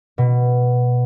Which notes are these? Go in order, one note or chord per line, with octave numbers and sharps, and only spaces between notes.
B2